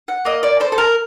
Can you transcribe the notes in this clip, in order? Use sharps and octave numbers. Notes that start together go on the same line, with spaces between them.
F#5
A#3 D#5
D5
A4 C5
A4
A#4